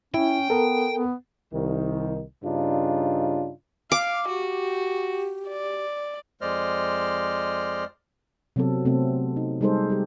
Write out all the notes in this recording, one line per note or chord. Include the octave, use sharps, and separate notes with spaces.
C#4 E4 G5
B3 A4 A#4
B3
C2 D#3
G2 C#3 D4 D#4 F4
F5 D6
F#4 G4
D5
F2 G#3 C5 D5 D#5 F6
C3 F#3 B3 C4 A4
C3 A3 B3 C4 A4
D#4
G3 G#3 D#4 G#4 A4 C5
G3 G4